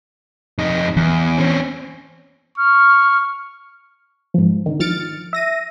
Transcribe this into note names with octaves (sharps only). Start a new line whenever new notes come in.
F2 D#4
E2 E3
C4 C#4
C#6 F6
G#2 F3
D3 D#3
D#3 F3 F6 A6 C#7 D7
E5 A#6 D#7